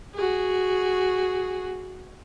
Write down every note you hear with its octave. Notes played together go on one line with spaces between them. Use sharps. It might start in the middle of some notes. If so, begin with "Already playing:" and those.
F#4 G#4